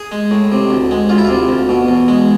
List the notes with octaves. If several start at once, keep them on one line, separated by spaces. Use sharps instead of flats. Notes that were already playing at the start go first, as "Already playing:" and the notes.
Already playing: G#4
G#3
A2
C3
D2
G#3
D2 F4
E4
C3 F4
D2
B2
E2
G#3